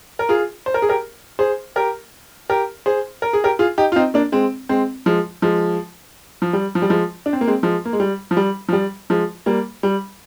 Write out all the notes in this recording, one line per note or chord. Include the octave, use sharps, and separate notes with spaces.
A#4
F4 G#4
C5
A#4
G#4
G4 A#4
G#4 C5
G4 A#4
G4 A#4
G#4 C5
A#4
G#4
G4 A#4
F4 G#4
D#4 G4
F4
C4 D#4
A#3 D4
G#3 C4
G#3 C4
F3 G#3
F3 G#3
F3
G3
F3
G3
F3 G#3
D4
C4
A#3
G#3 C4
F3 G#3
A#3
G#3
G3
F3
G3
F3
G3
F3 G#3
G3 A#3
G3